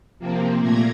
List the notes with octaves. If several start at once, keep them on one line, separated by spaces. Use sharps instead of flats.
C3 F3 A#3 C4
A#2 A3 A#3 A#5 G#6